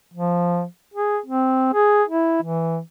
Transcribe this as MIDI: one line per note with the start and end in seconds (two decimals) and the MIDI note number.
0.14 0.65 53
0.94 1.19 68
1.26 1.70 60
1.74 2.03 68
2.08 2.41 64
2.42 2.79 52